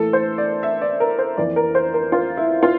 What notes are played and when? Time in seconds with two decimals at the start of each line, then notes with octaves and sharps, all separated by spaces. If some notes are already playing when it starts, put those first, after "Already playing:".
Already playing: A2 E3 A#3 A4
0.13 C5
0.38 D5
0.63 E5
0.81 D5
1.00 A#4
1.19 C5
1.37 F2 E3 A#3 D5
1.56 A#4
1.75 C5
1.94 A#4
2.12 F4
2.37 E4
2.63 F4